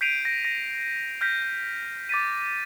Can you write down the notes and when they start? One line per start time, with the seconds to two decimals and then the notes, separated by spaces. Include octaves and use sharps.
0.01 G6 B6 C7 D7 D#7 F7
0.25 A#6 D7
0.45 A#6
1.21 F6 G6 A#6 B6
1.42 G6
2.09 D6 A6 B6 D#7